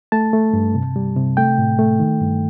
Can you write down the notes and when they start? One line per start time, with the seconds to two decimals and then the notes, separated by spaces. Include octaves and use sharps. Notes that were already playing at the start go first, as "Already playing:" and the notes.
0.12 A3 A5
0.33 A3
0.53 G2
0.74 C3
0.96 G3
1.17 C3
1.37 A3 G5
1.58 A2
1.79 A3
1.99 D#3
2.21 G2